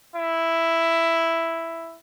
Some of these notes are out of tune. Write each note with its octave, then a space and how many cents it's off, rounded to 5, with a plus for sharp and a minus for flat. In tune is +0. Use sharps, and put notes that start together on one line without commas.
E4 +5